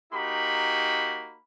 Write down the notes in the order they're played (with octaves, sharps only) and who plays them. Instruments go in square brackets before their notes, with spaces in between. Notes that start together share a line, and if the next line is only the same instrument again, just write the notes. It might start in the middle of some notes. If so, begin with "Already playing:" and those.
[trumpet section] A#3 D#4 F#4 G4 B5